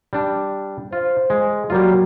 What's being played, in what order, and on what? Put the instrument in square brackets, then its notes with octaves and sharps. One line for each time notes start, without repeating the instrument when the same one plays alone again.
[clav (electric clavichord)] G3 D4
[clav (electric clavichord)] F4 [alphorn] C5
[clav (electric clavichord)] G#3
[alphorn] F#3 [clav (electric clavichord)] G3 A#3 F4